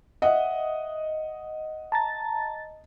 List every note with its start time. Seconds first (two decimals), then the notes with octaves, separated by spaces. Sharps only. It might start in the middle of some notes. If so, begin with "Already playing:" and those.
0.22 D#5 E5 F#5
1.92 A5 A#5 A6